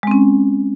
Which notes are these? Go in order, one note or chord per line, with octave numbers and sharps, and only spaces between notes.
G#3 C4 C#4